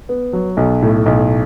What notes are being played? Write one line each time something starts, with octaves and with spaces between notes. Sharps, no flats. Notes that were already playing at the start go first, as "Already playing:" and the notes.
B3
F#3
B1
A2
B1